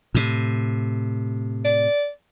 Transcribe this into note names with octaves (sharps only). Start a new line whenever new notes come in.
A2 C3
D5